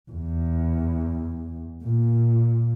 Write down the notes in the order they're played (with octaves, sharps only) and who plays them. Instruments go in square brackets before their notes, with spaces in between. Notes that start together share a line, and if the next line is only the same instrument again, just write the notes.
[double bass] E2
A#2